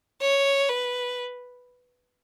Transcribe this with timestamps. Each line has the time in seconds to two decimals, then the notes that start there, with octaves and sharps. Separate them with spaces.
0.21 C#5
0.69 B4